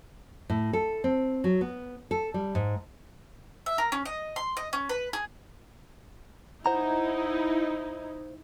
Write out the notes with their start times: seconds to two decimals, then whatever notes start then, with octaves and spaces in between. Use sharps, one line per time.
0.50 A2
0.73 A4
1.04 C4
1.44 F#3
1.61 B3
2.11 A4
2.34 G3
2.55 G#2
3.66 E5
3.78 A#4
3.92 C#4
4.05 D#5
4.36 C6
4.57 D#5
4.73 C#4
4.89 B4
5.13 G#4
6.66 D#4 E4 C5 F#5 A#5